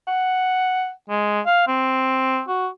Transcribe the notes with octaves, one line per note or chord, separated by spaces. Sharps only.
F#5
G#3
F5
C4
F#4